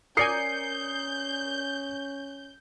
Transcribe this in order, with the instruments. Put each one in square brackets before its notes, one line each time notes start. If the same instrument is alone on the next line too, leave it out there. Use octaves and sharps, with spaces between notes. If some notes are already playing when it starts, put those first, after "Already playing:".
[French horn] C#4 [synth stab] A#4 D5 G#5 [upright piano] D#6 C7 C#7 [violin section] G6